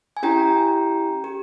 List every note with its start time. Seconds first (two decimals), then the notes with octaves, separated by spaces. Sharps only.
0.17 G#5
0.23 C#4 E4 G4 G5 A#5
1.24 G4